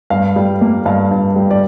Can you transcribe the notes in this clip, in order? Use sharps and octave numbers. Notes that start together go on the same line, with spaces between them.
G2 F5
G3
A#3
G2 F5
G2
G3
D5